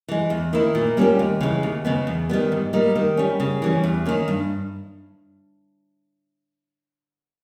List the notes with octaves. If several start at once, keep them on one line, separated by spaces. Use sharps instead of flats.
E3 G#3
E2
D#3 A#3 E4
A#2
G3 A#3 C#4 G4
D#2
C#3 E3 G#3
D#2
C#3 G#3 B3
E2
D#3 G3 B3
G#2
G3 A#3 D#4
D#3
G3 C#4
C#3
E3 G3 C#4
E2
D#3 A#3 C#4
G2